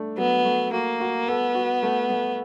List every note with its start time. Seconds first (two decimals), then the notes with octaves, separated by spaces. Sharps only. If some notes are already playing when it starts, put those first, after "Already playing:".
Already playing: A3 D4
0.18 F#3 B3
0.45 A3
0.72 A#3 F#4
1.00 F#4
1.28 B3 A4
1.55 F#4
1.83 A3
2.10 A3